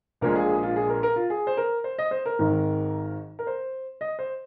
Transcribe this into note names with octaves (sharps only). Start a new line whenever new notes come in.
A#1 A#2 G#3 A#4
G#4
G#4
F4
G#4
A#4
A#4
F4
G#4
C5
A#4
C5
D#5
C5
A#4
G#1 G#2 D#3
A#4
C5
D#5
C5